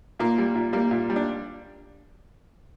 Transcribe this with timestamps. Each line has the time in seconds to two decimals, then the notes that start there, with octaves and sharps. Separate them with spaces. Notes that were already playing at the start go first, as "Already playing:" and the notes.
0.19 A#2 A#3
0.38 G3
0.55 A#2
0.73 G3 A#3
0.91 A#2
1.10 G3
1.16 D4